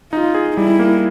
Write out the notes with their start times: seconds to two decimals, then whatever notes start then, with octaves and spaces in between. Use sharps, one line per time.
0.13 D#4 F4
0.35 G#4
0.57 G3 E4
0.79 A#3